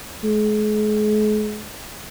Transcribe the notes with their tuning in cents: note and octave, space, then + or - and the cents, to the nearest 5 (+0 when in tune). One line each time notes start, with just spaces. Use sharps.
G#3 +40